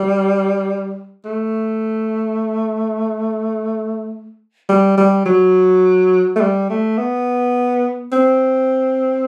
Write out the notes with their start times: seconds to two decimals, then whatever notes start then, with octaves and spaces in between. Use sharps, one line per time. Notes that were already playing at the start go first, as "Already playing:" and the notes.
Already playing: G3
1.25 A3
4.69 G3
4.98 G3
5.26 F#3
6.36 A3
6.41 G3
6.70 A3
6.98 B3
8.12 C4